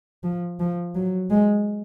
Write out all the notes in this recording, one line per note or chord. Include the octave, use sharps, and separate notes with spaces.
F3
F3
F#3
G#3